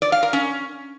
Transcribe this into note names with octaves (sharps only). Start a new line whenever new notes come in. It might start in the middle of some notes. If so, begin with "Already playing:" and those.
D5
F5
A#4
C#4